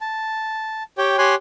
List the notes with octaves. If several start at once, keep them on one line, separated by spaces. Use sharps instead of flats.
A5
G4 C#5 G5
G4 C#5 G#5 C6 F#6